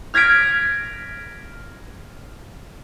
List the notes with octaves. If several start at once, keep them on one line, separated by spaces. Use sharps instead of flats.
F6 G#6 A#6 B6 D7